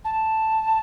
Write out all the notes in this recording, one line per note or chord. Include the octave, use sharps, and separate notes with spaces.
A5